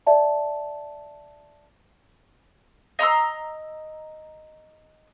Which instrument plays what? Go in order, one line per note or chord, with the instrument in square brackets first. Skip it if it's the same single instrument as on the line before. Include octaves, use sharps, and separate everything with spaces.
[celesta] D5 E5 A5
[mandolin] D#5 A#5 C6 E6